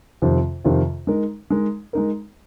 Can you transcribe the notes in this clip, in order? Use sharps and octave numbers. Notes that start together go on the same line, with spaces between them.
F2 C3 D#3 C4 F4
F2 C3 D#3 C4 F4
G#3 D#4 A#4
G#3 D#4 A#4
G#3 D#4 A#4